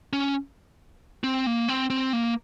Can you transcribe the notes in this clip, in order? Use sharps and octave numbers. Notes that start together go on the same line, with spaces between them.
C#4
C4
A#3
C4
C4
A#3